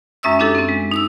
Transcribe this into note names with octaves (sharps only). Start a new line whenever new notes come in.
F#2 G#3 C#4 E5 D#6 E6
C#4 D4 E4 G4 A4
C4 C#4
G#3
D#4 D#6 E6